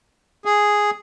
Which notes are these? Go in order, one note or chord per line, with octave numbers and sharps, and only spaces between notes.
G#4